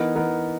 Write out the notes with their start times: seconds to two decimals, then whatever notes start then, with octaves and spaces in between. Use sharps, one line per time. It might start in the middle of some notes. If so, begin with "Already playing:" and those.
Already playing: E3 B3 D#4 A#4
0.16 E3 B3 D#4 A#4